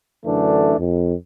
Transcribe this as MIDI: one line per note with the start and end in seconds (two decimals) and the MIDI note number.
0.25 0.77 42
0.25 0.77 50
0.25 0.77 52
0.25 0.77 57
0.25 0.77 62
0.78 1.13 41